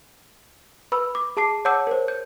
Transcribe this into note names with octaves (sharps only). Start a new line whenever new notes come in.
B4 B5 E6
D6
G#4 A5 D6 C7
C#5 F#5 A5 D6 E6 G6
A#4 C5
G6